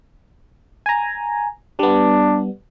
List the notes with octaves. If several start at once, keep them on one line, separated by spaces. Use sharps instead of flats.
G#5 A#5
G3 B3 D4